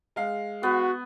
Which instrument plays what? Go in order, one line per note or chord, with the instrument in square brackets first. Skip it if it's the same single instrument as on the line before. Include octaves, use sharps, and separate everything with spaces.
[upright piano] G#3 F5
[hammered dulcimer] B3 [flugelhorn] F#4